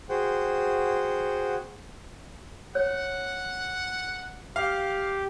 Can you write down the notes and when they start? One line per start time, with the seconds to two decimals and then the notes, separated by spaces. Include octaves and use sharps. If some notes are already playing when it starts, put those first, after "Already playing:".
0.09 F#4 G#4 C5 F#5 G5
2.75 C#5 F#5
4.56 G4 F5